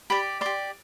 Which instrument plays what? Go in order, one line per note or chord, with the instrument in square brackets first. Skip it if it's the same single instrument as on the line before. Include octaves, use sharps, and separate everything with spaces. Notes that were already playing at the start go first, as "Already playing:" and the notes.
[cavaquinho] G4 D5 B5
G4 D5 C6